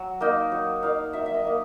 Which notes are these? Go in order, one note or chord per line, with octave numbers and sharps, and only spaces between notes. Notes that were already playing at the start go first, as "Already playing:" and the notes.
Already playing: F#3
A#3 D#4
F#3
A#3 D#4 F5
F#3 E5
E5
D#5
A#3 D#4